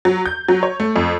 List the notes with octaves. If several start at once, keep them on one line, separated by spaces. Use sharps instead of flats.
F#3
G6
F#3
C#5
A3
F2